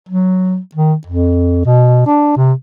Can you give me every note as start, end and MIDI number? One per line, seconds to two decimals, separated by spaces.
0.09 0.58 54
0.75 0.94 51
1.07 1.61 41
1.66 2.03 47
2.06 2.36 62
2.36 2.53 48